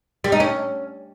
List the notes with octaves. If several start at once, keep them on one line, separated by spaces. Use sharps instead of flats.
G3
D#4
C#4